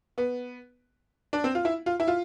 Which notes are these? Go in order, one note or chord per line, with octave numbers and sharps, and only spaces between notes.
B3
D4
C4
F4
E4
F4
E4
F4